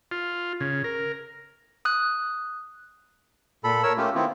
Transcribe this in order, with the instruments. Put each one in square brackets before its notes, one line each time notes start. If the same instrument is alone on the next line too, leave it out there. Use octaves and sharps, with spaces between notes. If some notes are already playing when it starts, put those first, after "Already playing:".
[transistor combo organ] F4
C#3
A#4
[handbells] D#6 F#6
[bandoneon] A#2 A4 B5
A#4 C#5 E6
A3 A#3 C#4 F4 G4
D#3 B3 C4 E4 F4